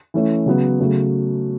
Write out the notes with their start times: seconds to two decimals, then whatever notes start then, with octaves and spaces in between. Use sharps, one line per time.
0.14 E3 A3 C#4
0.46 C#3 F#3 B3
0.79 C#3 F#3 A3